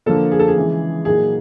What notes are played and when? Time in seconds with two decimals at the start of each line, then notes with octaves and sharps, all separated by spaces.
0.06 D3 F3 A#3 A4
0.31 G#4
0.39 A4
0.48 G#4
0.56 C#3 E3 G#3
1.05 A#2 F#3 A#3 D#4 F#4 G#4